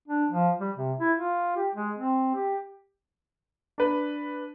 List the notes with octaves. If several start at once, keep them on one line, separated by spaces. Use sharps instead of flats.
D4
F3
G3
C3
E4
F4
G4
G#3
C4
G4
D4 B4